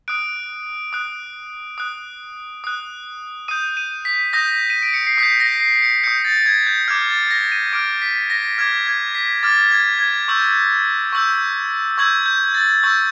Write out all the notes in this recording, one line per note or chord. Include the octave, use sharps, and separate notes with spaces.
D#6 F#6 D7
D#6 F#6
D#6 F#6
D#6 F#6
D#6 G6 D#7
D#7
B6
D#6 G6 A#6
D#7
D7
C#7
C7
D#6 B6
G6
A#6
C7
C#7
D#6 G6 C#7
A6
G#6
G6
D6 F6 G#6
A6
A#6
D#7
D6 F6 D7
B6
A#6
D6 F6 G#6
G#6
B6
D6 F6 A6
G#6
G#6
C#6 E6 G6
C#6 E6 G6
C#6 E6 G6 G#6
G6
A6
C#6 E6 G6